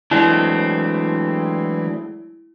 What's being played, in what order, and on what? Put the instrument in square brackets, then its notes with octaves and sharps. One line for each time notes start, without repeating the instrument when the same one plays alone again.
[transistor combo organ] E3 [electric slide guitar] F#3 G#3 D4 [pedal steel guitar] A3 C4 [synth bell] E4